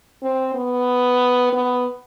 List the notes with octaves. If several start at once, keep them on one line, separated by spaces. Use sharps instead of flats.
C4
B3
B3